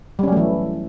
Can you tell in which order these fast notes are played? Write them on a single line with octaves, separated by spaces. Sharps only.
G3 C#4 F#3 A3 E3